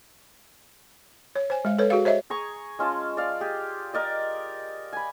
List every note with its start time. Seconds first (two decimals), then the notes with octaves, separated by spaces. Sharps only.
1.36 C#5
1.50 C5 G#5
1.65 G#3 F5
1.78 A4 B4 C#5
1.90 F#4 G#4 F5
2.05 C5 C#5 D#5 E5
2.30 G#4 A#5 C#6
2.79 G#3 C#4 F4 A5
3.17 D5 F5
3.41 G4 G#4
3.94 A#4 D5 D#5
4.93 G#5 B5